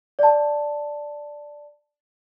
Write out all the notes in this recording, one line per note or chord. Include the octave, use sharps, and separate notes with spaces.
D5 A5